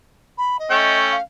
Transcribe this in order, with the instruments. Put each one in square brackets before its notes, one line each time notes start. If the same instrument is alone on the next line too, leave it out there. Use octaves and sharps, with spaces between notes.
[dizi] B5
D#5
[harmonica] A3 C#4 G5
[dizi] F5